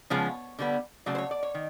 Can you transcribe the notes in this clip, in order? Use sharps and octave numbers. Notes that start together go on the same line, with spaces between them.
C#3 F3 G#3 B3 C#5
D3 G3 B3
C#3 F#3 A3 D5
C5
C#5
D5
C#5
D#3